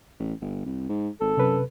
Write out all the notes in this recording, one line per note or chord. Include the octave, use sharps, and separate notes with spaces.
A1
G1
C2
G#2
G#1 A4
F#2 C3 B4